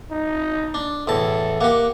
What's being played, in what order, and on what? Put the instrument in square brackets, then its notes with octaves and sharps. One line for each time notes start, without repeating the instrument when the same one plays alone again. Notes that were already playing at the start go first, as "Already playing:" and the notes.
[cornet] D#4
[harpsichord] D4
[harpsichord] E2 A2 A5 [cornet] A4
[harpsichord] A#3 G4 [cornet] F#5